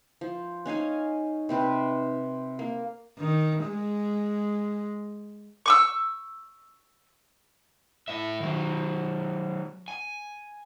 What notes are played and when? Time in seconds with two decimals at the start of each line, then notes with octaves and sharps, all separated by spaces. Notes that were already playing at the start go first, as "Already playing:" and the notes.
0.21 F3
0.66 C#4 D#4 F5 G#5
1.49 C3 C4 B4
2.59 A#3
3.18 D#3
3.65 G#3
5.66 C#6 D6 E6
8.08 A2 E5
8.40 D#3 F#3
9.88 G#5